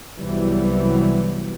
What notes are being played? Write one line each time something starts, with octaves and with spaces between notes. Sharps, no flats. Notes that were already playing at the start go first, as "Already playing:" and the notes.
C2 E3 F#3 G3 B3